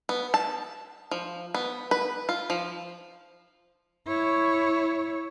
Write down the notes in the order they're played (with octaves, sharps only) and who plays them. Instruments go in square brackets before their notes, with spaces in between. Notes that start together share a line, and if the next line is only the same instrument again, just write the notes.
[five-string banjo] B3
A5
F3
B3
B4
F4
F3
[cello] E4 C#5